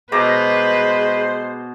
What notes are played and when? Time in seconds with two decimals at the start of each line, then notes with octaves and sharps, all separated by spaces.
0.12 B2 G#3 B4 C5 A#5 D6